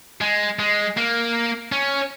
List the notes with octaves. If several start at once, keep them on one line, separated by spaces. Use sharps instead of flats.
G#3
G#3
A#3
C#4